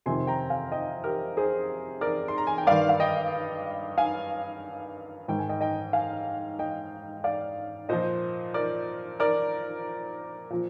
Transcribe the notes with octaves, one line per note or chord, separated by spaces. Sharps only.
F2 C3 D#3 G#5 C6
G5 A#5
F5 G#5
D#5 G5
G4 A#4
G#4 C5
A#4 D5
C6
A#5
G#5
G5
G2 D#3 D5 F5
F5
D#5 G5
F5 G#5
G#2 D#3 G5
G#5
D#5 G5
D#5 G5
F5 G#5
D#5 G5
D5 F5
A#2 F3 C5 D#5
A#4 D5
A#4 D5
A#2 F3